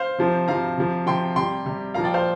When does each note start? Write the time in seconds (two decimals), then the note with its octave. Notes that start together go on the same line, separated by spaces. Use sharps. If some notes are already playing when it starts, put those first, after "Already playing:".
Already playing: C5 F5
0.18 C3 F3
0.48 C3 F3 F5 A#5
0.78 C3 F3
1.06 C3 F3 G5 C6
1.36 C3 G3 G5 C6
1.66 C3 G3
1.94 A#2 F3 F5 A#5
2.04 D5 G5
2.14 C5 F5